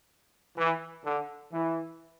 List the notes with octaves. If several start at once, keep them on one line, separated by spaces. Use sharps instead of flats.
E3
D3
E3